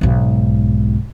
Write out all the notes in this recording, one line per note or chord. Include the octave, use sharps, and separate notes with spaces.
B1 G#2